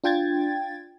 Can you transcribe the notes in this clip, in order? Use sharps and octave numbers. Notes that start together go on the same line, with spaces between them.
D4 F4 G5 G#6 A6